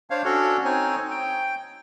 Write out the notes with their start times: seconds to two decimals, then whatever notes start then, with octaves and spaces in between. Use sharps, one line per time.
0.10 D4 C5 C#5 F5
0.25 C#4 D4 F#4 A4 C#5
0.65 C4 D#4 C#5 G#5
1.11 G5